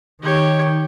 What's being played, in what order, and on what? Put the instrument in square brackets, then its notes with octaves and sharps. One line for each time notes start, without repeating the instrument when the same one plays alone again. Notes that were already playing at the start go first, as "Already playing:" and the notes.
[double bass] D#3 [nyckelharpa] G4 C#5